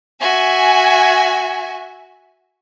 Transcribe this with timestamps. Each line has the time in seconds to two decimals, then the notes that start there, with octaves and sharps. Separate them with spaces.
0.21 F#4 E5 G#5